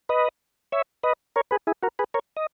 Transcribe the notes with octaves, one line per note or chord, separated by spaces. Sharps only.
B4 D#5
C#5 E5
B4 D#5
A#4 C#5
G#4 B4
E4 G#4
F#4 A#4
G#4 B4
A#4 C#5
D#5